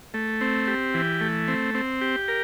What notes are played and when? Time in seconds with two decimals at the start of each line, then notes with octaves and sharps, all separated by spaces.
0.14 A3
0.41 C4
0.67 G4
0.94 E3
1.21 A3
1.48 C4
1.74 C4
2.01 G4
2.28 A#4